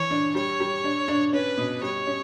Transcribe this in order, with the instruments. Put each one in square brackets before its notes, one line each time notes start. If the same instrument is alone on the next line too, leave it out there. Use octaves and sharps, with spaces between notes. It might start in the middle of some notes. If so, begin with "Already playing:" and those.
Already playing: [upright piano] E3 [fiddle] C#5
[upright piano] D4
[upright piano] G3 [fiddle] C#5
[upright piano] G3
D4
D4
[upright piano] C#4 [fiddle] B4
[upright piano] B2
[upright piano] G3 [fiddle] C#5
[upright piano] C#4